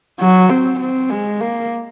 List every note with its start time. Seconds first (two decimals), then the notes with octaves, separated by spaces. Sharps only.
0.20 F#3
0.49 C4
0.80 C4
1.10 G#3
1.40 A#3